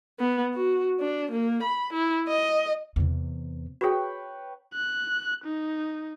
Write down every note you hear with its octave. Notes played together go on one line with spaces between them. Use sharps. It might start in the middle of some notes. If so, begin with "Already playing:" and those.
B3
F#4
D4
A#3
B5
E4
D#5
E2 C3
F#4 G#4 B4 C#5 G5
F#6
D#4